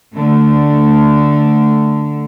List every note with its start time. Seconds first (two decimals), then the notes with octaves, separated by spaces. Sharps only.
0.13 D3 A3